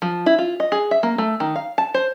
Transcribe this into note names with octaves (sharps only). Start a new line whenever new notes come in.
F3
E4
F4
D#5
G#4
E5
A#3
A3
D#3
F5
A5
C5